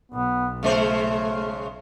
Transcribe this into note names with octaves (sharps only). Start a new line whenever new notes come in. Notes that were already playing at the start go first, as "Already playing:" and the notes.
B1 B3
C#3 G#3 A3 C5